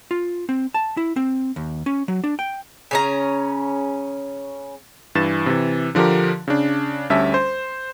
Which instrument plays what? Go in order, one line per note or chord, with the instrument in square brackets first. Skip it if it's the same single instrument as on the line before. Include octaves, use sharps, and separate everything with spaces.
[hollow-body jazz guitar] F4
C4
A5
E4
C4
D#2
C#4
F#3
D4
G5
[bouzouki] C#3 C#4 A#5
[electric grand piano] G2 E3 A6 E7
C3 E3
D3 F3 D4 G4 A#4
C#3 D4
D2 G3 C#4 E5 A5
C5